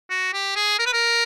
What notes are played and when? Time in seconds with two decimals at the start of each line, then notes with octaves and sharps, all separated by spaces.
0.10 F#4
0.34 G4
0.56 G#4
0.79 A#4
0.86 B4
0.93 A#4